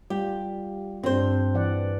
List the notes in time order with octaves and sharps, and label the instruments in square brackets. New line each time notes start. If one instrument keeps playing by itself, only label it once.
[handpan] G3 F4 [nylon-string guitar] G4
[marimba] G2 [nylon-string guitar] C4 C5 [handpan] D4
[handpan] E3 D5 F#5